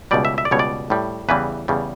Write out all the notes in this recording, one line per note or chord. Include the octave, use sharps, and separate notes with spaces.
C#2 B2 G3 D5
E5
E5
D5
C#2 B2 G3 C#5
D5
A2 G3
E2 C#3 E3 G3 B4
E2 C#3 G3